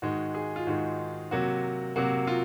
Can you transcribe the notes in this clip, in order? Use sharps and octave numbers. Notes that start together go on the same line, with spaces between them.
G#2 D#3 G#3 F#4
G#4
F4
G#2 D#3 G#3 F#4
C3 F#3 A#3 F#4
C3 F#3 A#3 F#4
F4